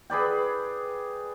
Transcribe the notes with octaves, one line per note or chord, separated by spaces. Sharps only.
G#4 B4 D5 G5